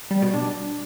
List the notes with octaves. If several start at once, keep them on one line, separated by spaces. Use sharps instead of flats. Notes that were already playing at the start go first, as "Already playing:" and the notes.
G3
B2
D4